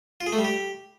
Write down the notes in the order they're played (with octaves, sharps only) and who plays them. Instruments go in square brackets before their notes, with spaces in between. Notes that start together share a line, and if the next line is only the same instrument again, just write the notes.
[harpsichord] F4
G#4
A3
G3
G4